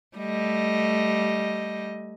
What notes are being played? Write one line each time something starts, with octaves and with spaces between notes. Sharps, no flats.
G3 A3 D#5